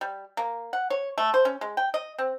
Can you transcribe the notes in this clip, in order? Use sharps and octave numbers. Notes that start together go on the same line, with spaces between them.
G3
A#3
F#5
C#5
A3
C5
C#4
G#3
G5
D#5
C4